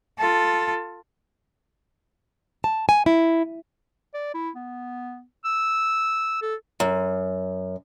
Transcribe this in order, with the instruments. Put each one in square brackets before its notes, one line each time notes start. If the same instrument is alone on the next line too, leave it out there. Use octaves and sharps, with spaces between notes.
[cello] F4 A4
[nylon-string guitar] A5
G#5
E4
[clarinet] D5
E4
B3
E6
A4
[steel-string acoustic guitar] F#2